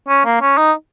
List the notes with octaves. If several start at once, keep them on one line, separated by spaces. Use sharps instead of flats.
C#4
A#3
C#4
D#4